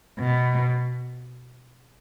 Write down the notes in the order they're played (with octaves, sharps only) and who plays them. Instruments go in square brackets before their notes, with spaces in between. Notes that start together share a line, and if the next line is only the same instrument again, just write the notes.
[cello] B2